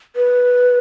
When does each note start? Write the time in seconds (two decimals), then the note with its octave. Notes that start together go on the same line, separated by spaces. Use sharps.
0.16 B4